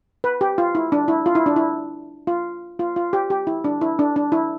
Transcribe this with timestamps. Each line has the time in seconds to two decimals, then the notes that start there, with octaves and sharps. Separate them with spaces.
0.24 B4
0.41 G4
0.58 F4
0.75 E4
0.92 D4
1.08 E4
1.26 F4
1.35 E4
1.46 D4
1.56 E4
2.27 F4
2.79 F4
2.96 F4
3.13 G4
3.30 G4
3.47 E4
3.64 D4
3.81 E4
3.99 D4
4.16 D4
4.32 E4